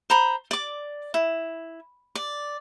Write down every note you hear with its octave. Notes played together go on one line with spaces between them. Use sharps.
C5 A#5 B5
D5 D6
E4
D5